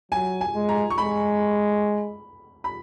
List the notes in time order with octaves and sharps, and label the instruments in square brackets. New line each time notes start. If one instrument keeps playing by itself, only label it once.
[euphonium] F#3 [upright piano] G#5
[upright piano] G#5
[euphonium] G#3
[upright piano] A#5
C#6
[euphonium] G#3 [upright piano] B5
[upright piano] B5